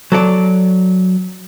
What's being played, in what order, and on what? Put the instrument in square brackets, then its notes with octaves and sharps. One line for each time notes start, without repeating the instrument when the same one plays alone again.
[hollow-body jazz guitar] F#3 A4 D5